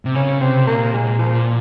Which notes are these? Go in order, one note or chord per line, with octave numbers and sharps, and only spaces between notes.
C3
C#3 C#4
C3 C4
A#2 A#3
G#3
F3